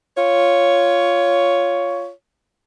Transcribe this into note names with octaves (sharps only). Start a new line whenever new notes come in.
F4 C#5